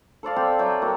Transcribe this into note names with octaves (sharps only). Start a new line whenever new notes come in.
A4 C5 D5 F5
C4 G5 C6
F#3 E5 G5 D6
A#3 F#4